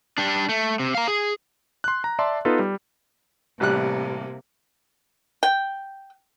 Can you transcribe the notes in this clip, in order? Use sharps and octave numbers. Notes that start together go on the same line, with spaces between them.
G3 D4
A3
C3
F5 A#5
G#4
C6 F#6
A#5
D5 E5 A5 C6
B3 D#4 F4 A4 B4
G3
A1 C3 G3 A#3 F#6
G5